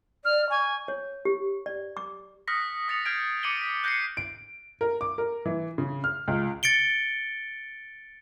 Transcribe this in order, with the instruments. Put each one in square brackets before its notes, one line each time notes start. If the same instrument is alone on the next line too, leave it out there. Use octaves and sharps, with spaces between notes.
[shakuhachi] D5 [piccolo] F6
[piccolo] G#5 [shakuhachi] C#6
[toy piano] C#5
G4
D5
D6
[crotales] D#6 F6 F#6 A#6 B6 C#7
D#6 A6 C#7 F7
F6 G6 G#6 C7 D7
D6 A6 C#7 D#7 F#7 G7
B6 D7
F#6 G6 A#6 C7 C#7
[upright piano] D7
A#4
D6
A#4
E3
C#3
F6
C#2
[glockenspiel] A6 C#7 D7 G7